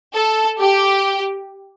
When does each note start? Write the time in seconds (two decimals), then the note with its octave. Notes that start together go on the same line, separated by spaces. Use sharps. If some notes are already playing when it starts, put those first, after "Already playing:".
0.14 A4
0.59 G4